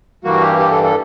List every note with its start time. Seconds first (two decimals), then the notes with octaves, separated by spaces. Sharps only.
0.24 G2 E3 G3 A#3 F#4
0.41 G4
0.59 G4
0.72 A4
0.83 A4